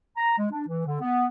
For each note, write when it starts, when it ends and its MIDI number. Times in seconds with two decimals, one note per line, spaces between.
0.17 0.37 82
0.38 0.47 56
0.52 0.63 62
0.67 0.83 52
0.86 0.97 50
1.01 1.26 59